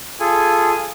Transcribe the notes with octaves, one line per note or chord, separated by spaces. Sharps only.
F4 G#4 A4 G#5